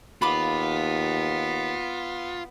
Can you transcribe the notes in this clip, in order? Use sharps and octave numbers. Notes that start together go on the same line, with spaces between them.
D#2 B3 F4 B5 D6